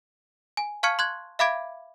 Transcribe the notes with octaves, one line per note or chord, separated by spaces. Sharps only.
G#5
F5 A5 C#6 F6 G#6 C#7
C6 F#6 G#6
E5 F5 B5 D6 G#6 D7